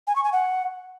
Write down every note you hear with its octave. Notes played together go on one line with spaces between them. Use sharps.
G#5
C#6
G#5
F#5